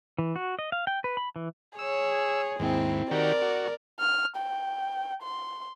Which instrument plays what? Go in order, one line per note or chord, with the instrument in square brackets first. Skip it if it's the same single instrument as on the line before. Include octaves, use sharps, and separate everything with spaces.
[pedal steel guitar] E3
F#4
D#5
F5
G5
B4
B5
E3
[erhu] G#4 [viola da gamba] C#5 [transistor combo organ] E6
[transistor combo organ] D#2 G#2 [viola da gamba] C4 E4
[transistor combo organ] D#3 F#4 G4 [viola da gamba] A#4 [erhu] D5
[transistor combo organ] F#4
[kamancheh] F6
G5
C6